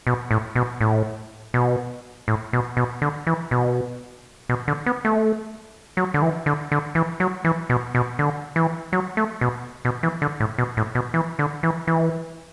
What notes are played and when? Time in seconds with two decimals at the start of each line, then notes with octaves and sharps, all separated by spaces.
0.07 B2
0.31 A2
0.55 B2
0.81 A2
1.54 B2
2.28 A2
2.53 B2
2.77 B2
3.02 D3
3.27 E3
3.51 B2
4.49 B2
4.68 D3
4.86 B3
5.05 A3
5.97 F#3
6.14 D3
6.22 E3
6.46 D3
6.72 D3
6.95 E3
7.20 F#3
7.44 E3
7.69 B2
7.95 B2
8.19 D3
8.56 E3
8.93 F#3
9.17 A3
9.41 B2
9.85 B2
10.03 E3
10.22 D3
10.40 A2
10.58 B2
10.77 A2
10.95 B2
11.14 E3
11.39 D3
11.63 E3
11.87 E3